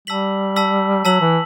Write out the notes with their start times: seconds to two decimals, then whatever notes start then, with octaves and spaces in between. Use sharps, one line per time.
0.07 G3 A5 E6 B6 F#7
0.56 A5 E6 B6 F#7
1.05 F#3 A5 E6 B6 F#7
1.21 E3